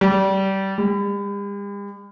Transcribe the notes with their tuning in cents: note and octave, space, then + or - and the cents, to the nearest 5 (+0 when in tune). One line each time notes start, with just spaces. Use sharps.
G3 -20
G3 +45